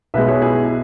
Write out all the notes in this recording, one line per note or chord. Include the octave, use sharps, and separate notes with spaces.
B1 B2 G#3 B3 B4 E5
G#4 C#5
E4 G#4